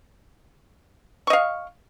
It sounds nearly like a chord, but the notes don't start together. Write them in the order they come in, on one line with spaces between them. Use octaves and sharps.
C#6 D#5 F5